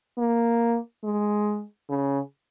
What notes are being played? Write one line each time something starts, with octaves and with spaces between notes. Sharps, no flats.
A#3
G#3
C#3